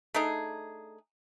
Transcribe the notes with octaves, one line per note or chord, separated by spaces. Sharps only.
A3 D4 D#4 G#4